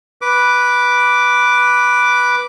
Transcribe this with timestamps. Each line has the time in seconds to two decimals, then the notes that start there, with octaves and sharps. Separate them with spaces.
0.22 B4 D6